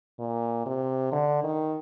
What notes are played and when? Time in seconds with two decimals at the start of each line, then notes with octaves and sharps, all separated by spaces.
0.19 A#2
0.66 C3
1.12 D3
1.44 D#3